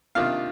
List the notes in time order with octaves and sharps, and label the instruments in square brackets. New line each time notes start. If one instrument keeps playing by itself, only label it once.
[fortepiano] C3 D#3 A#3 D4 F4 F5